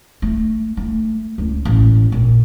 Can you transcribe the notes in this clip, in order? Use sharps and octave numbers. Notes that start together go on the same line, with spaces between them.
A3
A3
C#2
A1
A#2